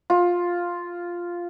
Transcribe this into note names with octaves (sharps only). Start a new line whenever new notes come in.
F4